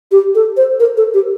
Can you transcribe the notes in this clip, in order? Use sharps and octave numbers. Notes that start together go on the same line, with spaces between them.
G4
A4
C5
A#4
A4
G4